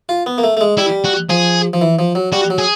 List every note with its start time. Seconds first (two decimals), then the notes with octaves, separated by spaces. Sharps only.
0.09 F4
0.26 B3
0.38 A#3
0.44 A3
0.57 A3
0.61 G#3
0.77 G3 E4
1.04 F#4
1.30 F3 G#4
1.73 F3
1.81 E3
1.99 F3
2.15 F#3
2.32 G3 F#4
2.50 F#3
2.58 G#4